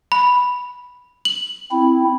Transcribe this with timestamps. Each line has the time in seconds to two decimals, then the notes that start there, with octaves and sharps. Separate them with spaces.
0.12 B5
1.25 F#7
1.72 C4 E4